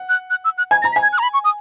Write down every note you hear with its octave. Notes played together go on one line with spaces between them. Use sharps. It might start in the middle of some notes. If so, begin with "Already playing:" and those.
Already playing: F#5
F#6
F#6
E6
F#6
G#5 G#6
A#5 A#6
B6
G#5
G#6
F#6
A#5
B5
C#6
D#6